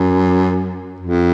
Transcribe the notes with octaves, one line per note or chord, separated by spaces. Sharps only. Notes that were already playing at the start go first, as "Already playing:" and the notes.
Already playing: F#2
F2